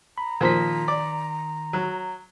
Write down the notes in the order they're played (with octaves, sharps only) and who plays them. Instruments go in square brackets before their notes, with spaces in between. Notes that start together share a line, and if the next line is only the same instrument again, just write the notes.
[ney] A#5 [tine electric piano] B5
[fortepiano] A#2 F3 [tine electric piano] D#3 C6 B6
[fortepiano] D5
F#3